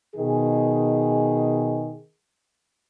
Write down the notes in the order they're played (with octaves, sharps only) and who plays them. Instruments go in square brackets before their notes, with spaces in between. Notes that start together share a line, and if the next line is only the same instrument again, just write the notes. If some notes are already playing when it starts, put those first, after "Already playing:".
[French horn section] B2 D#3 G#4